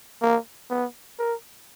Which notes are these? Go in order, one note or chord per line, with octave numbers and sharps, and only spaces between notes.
A#3
B3
A#4